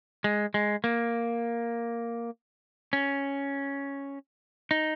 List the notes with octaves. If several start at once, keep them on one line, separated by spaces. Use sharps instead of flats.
G#3
G#3
A#3
C#4
D#4